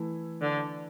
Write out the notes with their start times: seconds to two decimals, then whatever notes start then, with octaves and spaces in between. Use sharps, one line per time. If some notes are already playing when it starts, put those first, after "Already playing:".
Already playing: E3 A3 E4
0.42 D3